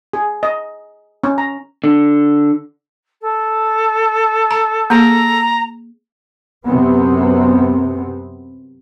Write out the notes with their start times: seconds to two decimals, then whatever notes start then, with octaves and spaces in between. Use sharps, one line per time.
0.13 G#4
0.43 D#5
1.24 C#4
1.38 A#5
1.84 D3
3.21 A4
4.51 A#5
4.90 A#3 G#4 A#5
6.65 F#2 C3 B3 C4